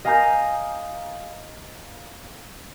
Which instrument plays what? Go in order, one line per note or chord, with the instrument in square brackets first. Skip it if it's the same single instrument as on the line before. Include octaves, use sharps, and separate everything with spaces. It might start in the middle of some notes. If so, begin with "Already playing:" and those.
[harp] D#5 F5 G#5 A#5 D#6 G6